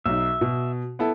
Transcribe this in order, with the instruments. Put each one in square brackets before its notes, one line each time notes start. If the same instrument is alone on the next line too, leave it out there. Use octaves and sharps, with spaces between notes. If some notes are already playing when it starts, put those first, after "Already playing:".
[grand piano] B1 D#4 [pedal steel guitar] E5
[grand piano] B2
B3 E4 A4